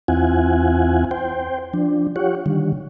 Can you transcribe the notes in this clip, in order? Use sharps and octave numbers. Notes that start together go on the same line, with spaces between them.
E2 C4 E4 F4 F#5 G#5
C5 G5
F3 D4
F4 G4 C#5 F#5
D3 D#3 G3